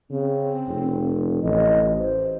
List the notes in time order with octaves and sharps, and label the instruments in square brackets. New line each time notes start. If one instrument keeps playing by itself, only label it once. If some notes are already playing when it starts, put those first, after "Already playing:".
[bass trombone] C#3 [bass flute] C4
[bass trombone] F1
[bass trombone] A1 [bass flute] D#5
[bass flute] C5